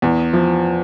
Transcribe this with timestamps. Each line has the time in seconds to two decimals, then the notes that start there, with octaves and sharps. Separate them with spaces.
0.02 E2
0.33 F3